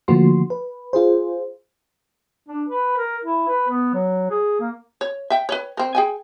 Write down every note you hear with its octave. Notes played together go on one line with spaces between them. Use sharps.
D3 F3 A3 A#3 F#4 C6
B4
F4 G#4 C5
D4
B4
A#4
E4
B4
B3
F#3
G#4
A#3
C#5
E5 G5
B4 C#5
C4 A#4
G#4 G5 G#5